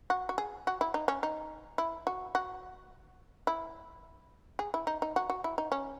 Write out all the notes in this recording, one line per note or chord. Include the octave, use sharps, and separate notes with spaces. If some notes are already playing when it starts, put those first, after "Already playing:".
F#4
F#4
G#4
F#4
E4
D#4
C#4
D#4
E4
F#4
F#4
E4
G#4
E4
D#4
D#4
F#4
F#4
E4
D#4
C#4